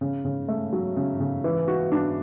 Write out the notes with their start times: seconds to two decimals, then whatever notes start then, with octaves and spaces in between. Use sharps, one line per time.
0.01 C#3
0.25 C#3
0.48 A3
0.73 F#3
0.96 C#3
1.20 C#3
1.44 E3
1.68 F#4
1.92 D4